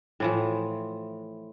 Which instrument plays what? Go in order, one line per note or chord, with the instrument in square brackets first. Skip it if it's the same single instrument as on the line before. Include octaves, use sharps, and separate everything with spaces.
[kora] A2 E3 F3